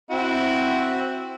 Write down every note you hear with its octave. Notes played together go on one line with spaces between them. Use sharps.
C4 E4 F#4